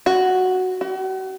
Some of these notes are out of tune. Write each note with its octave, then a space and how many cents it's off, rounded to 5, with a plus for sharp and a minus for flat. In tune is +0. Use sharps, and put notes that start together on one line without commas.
F#4 +0
F#4 +40